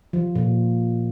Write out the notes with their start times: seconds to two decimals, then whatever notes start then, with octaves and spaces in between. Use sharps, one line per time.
0.13 F3
0.35 A#2